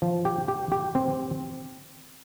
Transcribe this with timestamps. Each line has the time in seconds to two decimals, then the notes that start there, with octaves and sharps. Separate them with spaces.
0.02 F3
0.25 G4
0.48 G4
0.72 G4
0.95 C4